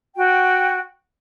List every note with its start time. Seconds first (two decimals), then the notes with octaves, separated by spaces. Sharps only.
0.16 F#4 G5